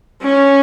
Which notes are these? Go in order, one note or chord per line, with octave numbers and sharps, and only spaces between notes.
C#4